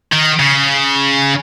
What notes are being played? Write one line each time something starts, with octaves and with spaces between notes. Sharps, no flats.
D#3
C#3